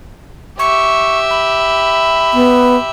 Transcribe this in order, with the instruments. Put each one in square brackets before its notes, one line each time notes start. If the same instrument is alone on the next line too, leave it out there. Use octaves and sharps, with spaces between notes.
[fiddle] G4 E5 [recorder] C#6
[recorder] B5
[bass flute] B3